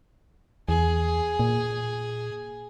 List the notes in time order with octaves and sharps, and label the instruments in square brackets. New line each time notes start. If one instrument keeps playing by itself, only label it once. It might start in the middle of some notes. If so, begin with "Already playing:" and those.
[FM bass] E2 [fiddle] G#4
[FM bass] A#2